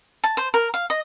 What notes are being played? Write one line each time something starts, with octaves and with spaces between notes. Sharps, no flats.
A5
C5
A#4
F5
D#5